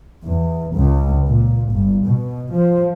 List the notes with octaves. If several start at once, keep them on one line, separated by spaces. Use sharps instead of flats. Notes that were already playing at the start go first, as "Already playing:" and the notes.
E2
C#2
A#2
G1
B2
F3